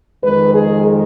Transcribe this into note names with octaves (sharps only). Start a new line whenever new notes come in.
F2 D#3 G#3 B4
G#4